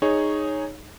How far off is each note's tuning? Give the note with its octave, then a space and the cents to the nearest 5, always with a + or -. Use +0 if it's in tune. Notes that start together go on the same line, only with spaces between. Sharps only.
D#4 -5 G#4 +0 C#5 -5